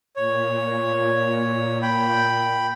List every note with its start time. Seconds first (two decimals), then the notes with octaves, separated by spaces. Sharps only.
0.16 A#2 C#5
1.82 G5 B5